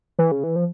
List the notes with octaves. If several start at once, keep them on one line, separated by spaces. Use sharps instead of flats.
E3
C#3
E3
F3